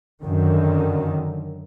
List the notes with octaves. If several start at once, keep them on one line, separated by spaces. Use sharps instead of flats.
F#2 D3 D#3